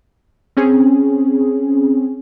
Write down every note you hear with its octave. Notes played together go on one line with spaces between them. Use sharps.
C4 C#4 G#4